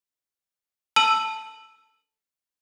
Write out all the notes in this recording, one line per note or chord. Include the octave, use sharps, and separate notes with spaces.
A5 E6 D#7 F#7